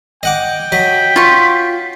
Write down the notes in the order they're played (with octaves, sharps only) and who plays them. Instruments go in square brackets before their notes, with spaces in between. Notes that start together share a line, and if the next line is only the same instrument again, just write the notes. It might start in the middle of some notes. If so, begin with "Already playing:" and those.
[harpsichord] D#5 F#5 D6 [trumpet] G5
[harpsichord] F#3 D#5 [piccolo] B6
[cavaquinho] F4 C#6